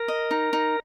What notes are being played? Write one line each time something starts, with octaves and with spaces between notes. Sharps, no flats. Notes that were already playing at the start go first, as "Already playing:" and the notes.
Already playing: A#4
D#5
D#4
D#4